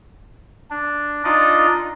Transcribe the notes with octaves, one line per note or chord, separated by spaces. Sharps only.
D4
D4 D#4 F4 D5 D#5